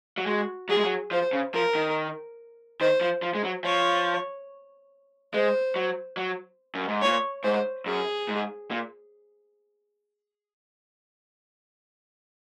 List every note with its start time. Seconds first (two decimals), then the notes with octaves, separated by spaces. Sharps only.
0.18 F#3
0.27 G#3 F#4
0.69 F#3 G#4
0.77 G#3
0.85 F#3
1.11 F3 C5
1.33 C#3
1.54 F3 A#4
1.75 D#3
2.80 D#3 C5
3.01 F3
3.22 F3
3.35 G#3
3.44 F#3
3.64 F3 C#5
5.33 G#3 C5
5.76 F#3
6.17 F#3
6.75 F#2
6.88 G#2
7.02 A#2 C#5
7.44 G#2 C5
7.86 F#2 G#4
8.28 G#2
8.71 A#2